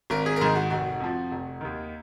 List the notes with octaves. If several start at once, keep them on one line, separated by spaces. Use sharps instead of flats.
G#1 A#4
G#4
A#4
G#2 D#3 G#4
F#4
F1 F#4
F2 F3
F1
D#2 D#3